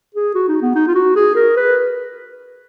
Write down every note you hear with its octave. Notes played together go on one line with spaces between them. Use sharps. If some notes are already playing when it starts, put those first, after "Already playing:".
G#4
F#4
D#4
B3
D#4
F4
F#4
G#4
A#4
B4